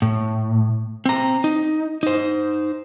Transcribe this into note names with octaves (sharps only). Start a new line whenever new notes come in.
A2
C4 A#5
D#4
D#4 C5